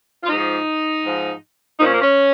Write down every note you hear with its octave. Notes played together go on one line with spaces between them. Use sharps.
F4
G#2 F3 D#4
G#2 F3
A#2 F3 D#4
C#4
A#3
C#4